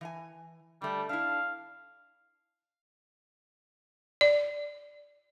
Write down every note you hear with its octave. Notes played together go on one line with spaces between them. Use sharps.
E3 F5 G#5
D3 G3 A3
D4 E4 F5
D5